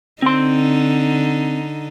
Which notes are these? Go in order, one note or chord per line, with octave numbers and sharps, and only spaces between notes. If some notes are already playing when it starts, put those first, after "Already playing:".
D3 C4 D#4 C6